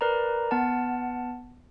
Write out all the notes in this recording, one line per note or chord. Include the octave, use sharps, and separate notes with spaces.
A#4 B4 D5 A#5
B3 F#5 A5